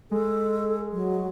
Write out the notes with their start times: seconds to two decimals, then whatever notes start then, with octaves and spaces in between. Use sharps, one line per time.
0.11 G#3 A4
0.92 F#3